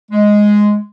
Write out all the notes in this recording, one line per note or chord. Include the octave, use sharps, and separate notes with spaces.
G#3